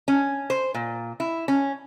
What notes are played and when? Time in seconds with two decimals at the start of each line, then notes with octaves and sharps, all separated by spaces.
0.08 C#4
0.50 C5
0.74 A#2
1.20 E4
1.48 C#4